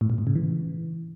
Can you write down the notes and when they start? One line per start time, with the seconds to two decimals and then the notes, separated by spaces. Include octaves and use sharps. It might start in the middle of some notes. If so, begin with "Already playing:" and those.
0.01 A2
0.10 A#2
0.18 G#2
0.27 C#3
0.35 E3